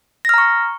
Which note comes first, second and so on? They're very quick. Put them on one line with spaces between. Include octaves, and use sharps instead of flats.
A#6 F6 A#5 C#6